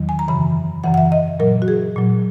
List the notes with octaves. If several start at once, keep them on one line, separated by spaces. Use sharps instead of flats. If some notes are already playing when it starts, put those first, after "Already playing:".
Already playing: E2 D#3 F#3
G#5
A#5
F#2 C#3 E3 B5
F#2 C#3 E3 F#5
F#5
E5
D#5
A#2 F#3 A#4
F#4
G#4
A#2 F#3